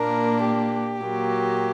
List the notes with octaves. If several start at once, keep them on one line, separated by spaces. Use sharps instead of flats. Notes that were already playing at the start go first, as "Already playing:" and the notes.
Already playing: A#2 A#3 D4 A#4
G4
A#2 F#3 A#3